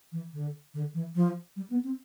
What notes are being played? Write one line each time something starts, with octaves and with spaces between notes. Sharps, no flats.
E3
D3
D3
E3
F3
G3
B3
C4